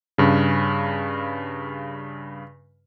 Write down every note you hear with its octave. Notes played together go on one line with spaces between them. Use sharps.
G2 C#3